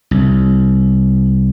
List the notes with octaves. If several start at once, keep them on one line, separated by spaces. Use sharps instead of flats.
C2